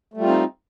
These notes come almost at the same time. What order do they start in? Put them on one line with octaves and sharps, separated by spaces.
A3 G3 F4 C4 D#4